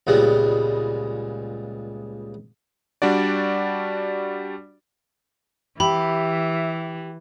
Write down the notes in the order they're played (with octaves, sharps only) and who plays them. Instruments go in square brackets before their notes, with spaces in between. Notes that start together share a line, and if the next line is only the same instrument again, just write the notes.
[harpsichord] C#2 A#2 G3 G#3 B3
[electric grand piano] G3 D4 F#4 D5
[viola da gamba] E3 [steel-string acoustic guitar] G4 [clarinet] E5 [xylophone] B5